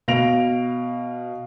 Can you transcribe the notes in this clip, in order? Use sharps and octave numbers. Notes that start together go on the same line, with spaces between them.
B2 F5 A#6 D7 F7